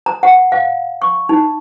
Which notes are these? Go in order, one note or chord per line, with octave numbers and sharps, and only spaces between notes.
A#5
F#5
F5
C#6
D#4